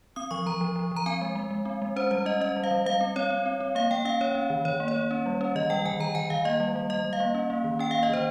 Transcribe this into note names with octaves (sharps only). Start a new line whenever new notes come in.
C4 D#6
F3 C#6
F3 A#5
F3
F3
F3
A#5
C4 G#5
G#3
G#3
G#3
C4
G#3
C#4 C5
G3 C5
C#4 D#5
C#4 D#5
G3
F5
G3
G3 F5
C4
C4 C#5
C4
C4
C4
A#3 F5
A#3 G5
C#4 F5
C#4 C#5
C#4
D#3
D#3 C#5
A#3
C#5
A#3
C#4
G3
C#4
D#3 D#5
G3 G5
D#3 G#5
D#3 A#5
D#3 G#5
D#3 F5
A#3 D#5
G3
G3
G3 D#5
G3
F5
A#3
C#4
A#3
D#3
C#4 G5
F5
A#3
D#5
D#3 C5